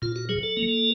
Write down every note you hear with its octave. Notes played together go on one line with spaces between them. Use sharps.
A#2 F4
F#4
F#3 G#4
A4
A#3